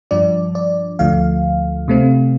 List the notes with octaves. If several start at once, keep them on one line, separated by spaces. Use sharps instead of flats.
G2 F3 D4 D5
D5
D2 D3 F3 A3 F5
C3 A3 C4